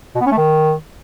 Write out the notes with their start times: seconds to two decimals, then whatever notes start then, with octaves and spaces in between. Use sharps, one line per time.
0.15 B2
0.21 B3
0.26 C#4
0.32 A3
0.37 D#3